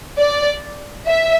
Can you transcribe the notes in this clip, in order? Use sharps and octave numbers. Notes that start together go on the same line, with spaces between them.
D5
E5